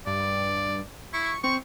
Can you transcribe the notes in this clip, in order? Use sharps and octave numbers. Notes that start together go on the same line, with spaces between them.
G2 D5
E4 C#6
C4 C#6